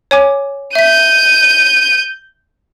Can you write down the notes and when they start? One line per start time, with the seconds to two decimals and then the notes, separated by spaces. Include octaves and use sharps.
0.11 C#5 G#5 D6
0.75 E5 G6 B6 D#7